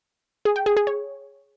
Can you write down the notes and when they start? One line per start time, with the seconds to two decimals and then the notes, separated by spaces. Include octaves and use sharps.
0.45 G#4
0.56 G5
0.66 G#4
0.77 G#4
0.87 C#5